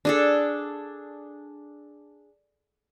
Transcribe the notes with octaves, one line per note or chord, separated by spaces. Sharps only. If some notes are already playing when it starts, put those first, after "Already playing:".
D4 G#4 A4